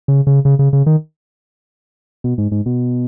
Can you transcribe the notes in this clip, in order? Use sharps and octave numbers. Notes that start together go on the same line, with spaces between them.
C#3
C#3
C#3
C#3
C#3
D#3
B2
G#2
G#2
B2